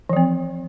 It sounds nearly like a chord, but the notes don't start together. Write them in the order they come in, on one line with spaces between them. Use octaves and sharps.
E3 F3 C4